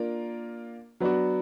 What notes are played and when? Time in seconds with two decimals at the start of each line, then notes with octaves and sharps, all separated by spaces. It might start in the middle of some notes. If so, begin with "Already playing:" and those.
Already playing: A#3 D4 F4 A#4
1.00 F#3 B3 D4 F#4